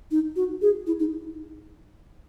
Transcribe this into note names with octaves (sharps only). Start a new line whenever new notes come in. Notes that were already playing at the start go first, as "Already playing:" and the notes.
D#4
F#4
G#4
E4
D#4